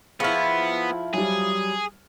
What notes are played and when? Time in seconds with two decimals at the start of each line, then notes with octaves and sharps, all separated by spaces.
0.20 F3 B3 E4 G#4 C#6 F6
1.14 F#3 G3 G#4